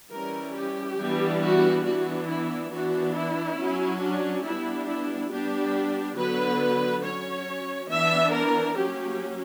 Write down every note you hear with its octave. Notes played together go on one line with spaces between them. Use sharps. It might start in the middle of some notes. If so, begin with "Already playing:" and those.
E3 G3 C#4 A#4
G4
E3 G3 B3 D4
F#4
E3 B3 D4 F#4
E4
E3 B3 D4 F#4
E4
F#3 C#4
D4
G3 B3 D4 E4
E4
G3 B3 D4 G4
D3 F#3 B3 B4
F#3 C#4 C#5
E3 B3 D4 E5
A#4
F#3 A#3 C#4 G4